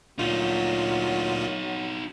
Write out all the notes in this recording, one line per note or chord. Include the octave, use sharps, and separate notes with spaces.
D2 A#2 F#3 D#4 F4 F#4